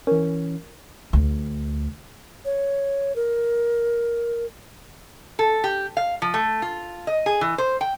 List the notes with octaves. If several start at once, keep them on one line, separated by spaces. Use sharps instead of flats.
E3 C#4 A#4
D2
C#5
A#4
A4
G4
F5
F3
A3
F4
D#5
G#4
E3
C5
G5